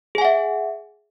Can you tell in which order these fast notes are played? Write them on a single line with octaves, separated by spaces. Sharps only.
G#4 G#5 F#5 E5